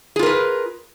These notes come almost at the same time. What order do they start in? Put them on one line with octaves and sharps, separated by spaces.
G#4 F4 A#4 B4